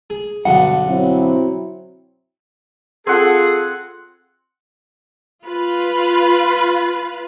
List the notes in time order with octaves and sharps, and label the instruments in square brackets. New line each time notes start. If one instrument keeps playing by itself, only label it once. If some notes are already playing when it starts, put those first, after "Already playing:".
[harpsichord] G#4
[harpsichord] B1 G2 D3 [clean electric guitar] F#5
[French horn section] F#3 C4 E4
[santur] C4 F#5 [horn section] F4 A4 [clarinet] G#4
[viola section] F4 B4